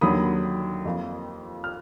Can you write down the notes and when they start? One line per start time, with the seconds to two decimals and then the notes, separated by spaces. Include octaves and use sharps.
0.01 D#2 D3 F#3 B5 D#6
0.85 F2 F3 A#3
1.64 F6